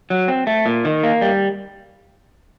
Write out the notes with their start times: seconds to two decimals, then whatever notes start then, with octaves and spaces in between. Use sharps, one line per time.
0.10 F#3
0.28 C4
0.47 A3
0.66 A#2
0.85 D#3
1.03 A#3
1.21 G3